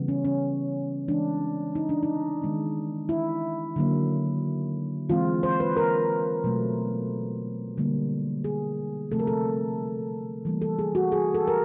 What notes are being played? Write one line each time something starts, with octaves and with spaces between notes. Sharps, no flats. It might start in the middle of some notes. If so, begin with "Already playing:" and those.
Already playing: C#3 E3 G3 B3
C#4
C#4
E3 G#3 C4 D4
D#4
D4
D#4
D#3 G#3 B3
E4
D3 F#3 A#3
E3 G#3 C4 F4
C5
B4
A#4
B2 F#3 A3
D3 G3 A#3
G#4
C3 F3 A3 C4 A4
A#4
A4
E3 G3 A#3
A4
G#4
F#4
G#4
A4
A#4